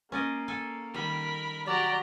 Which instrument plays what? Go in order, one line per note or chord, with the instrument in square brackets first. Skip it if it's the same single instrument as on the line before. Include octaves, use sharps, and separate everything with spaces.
[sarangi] A#3 [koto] C#4 D5 D#5
[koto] A4 G#5
[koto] D#3 G3 [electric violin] A#4 B5
[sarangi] F#3 [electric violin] G4 A#5 [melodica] D5